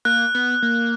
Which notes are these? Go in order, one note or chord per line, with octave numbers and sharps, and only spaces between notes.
A#3 F#6
B3
A#3